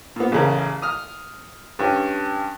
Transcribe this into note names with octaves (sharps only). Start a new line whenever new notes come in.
A#2 B3
A1 C#3 A#4
D#6 F6
G2 C#4